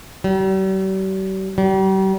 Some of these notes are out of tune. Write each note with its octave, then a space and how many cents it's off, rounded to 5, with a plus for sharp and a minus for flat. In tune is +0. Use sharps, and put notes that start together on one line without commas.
G3 -45
G3 -40